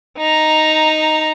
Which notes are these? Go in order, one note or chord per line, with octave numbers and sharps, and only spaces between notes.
D#4 A#5